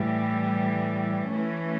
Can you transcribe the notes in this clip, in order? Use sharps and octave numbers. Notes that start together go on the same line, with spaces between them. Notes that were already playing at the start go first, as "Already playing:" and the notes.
Already playing: A2 E3 G3
E3 A3 C#4